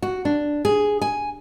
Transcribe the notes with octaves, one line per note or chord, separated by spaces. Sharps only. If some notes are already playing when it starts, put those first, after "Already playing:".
F#4
D4
G#4
G#5